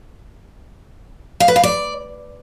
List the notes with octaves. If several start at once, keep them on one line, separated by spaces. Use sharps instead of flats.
F5
B4
F5
D5